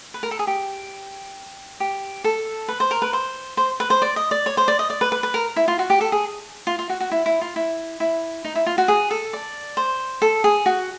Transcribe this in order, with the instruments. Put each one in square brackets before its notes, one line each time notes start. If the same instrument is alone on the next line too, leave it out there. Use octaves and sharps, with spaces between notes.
[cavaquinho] B4
A#4
A4
G#4
G4
G4
A4
B4
C5
A#4
B4
C5
C5
B4
C5
D5
D#5
D5
C#5
C5
D5
D#5
D5
B4
B4
B4
A#4
E4
F4
F#4
G4
A4
G#4
F4
F4
F#4
F#4
E4
E4
F4
E4
E4
D#4
E4
F4
F#4
G#4
A4
D5
C5
A4
G#4
F#4